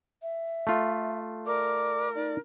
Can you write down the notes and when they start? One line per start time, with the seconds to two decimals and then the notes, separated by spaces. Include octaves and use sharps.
0.22 E5
0.67 A3 F4
1.46 A#4 D5 D6
2.15 D#4 D5